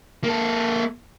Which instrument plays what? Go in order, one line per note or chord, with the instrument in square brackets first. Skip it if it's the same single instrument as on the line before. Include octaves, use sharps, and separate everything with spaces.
[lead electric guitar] A#3 A4